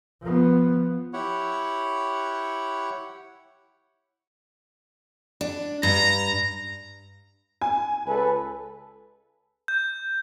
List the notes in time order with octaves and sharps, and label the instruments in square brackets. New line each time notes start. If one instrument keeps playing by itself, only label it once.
[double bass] F3 B3
[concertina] E4 G4 C#5 F#5
[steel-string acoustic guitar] D4
[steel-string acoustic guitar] G2 [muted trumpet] A#5
[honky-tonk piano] G#5
[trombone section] C#2 A4 B4
[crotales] G6